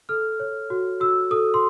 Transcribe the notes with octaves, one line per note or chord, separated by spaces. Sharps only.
A4 F6
C#5
F#4
F#4 E6
A4 D#6
C6